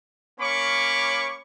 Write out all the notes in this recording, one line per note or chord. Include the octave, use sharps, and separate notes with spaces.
A#3 C#4 C#5 B5 C#6 D6